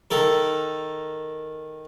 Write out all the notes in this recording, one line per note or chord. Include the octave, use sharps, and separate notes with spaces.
D#3 A4 A#4